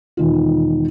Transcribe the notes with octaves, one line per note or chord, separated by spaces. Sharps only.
E1 D#3 F4